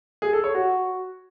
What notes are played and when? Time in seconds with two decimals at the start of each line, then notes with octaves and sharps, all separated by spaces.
0.22 G#4
0.33 A4
0.44 C#5
0.55 F#4